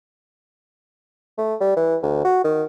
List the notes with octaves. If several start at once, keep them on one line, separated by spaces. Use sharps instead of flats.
A3
G3
E3
D2
F#4
D#3